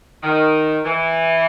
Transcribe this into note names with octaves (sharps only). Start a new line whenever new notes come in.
D#3
E3